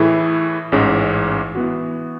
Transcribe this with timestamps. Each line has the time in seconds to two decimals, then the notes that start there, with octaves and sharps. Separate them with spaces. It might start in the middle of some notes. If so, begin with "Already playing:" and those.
Already playing: A2 E3 A3 E4 G#4
0.72 A1 G#2 G#3 C#4
1.55 E3 B3 F#4